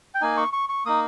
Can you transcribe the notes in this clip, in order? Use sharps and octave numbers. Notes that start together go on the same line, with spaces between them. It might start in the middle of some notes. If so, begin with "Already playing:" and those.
G5
A#3 D#4 G#5
C#6
C#6
C#6
A#3 D#4 D#6